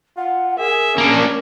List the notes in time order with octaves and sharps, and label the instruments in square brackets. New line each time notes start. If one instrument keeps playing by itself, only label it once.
[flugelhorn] F4 [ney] F#5
[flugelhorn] G#4 [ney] A#4 [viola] E5
[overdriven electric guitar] A#3 D4 [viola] C#4